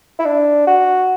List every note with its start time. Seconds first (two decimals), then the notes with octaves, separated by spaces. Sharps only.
0.19 E4
0.26 D4
0.67 F#4